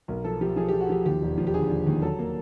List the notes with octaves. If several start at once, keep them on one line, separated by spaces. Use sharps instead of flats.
B1 A#4
F3 A4
F3 G4
F3 G#4
F3 G4
F#4
F3 G4
D#2 G4
E1
F3
G4
D3 G#4
F3
D#2
F#3 A4
A#3